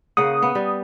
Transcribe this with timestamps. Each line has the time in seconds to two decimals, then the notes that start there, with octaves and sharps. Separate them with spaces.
0.17 C#3 A#3 F#5 D#6
0.42 B3
0.55 G3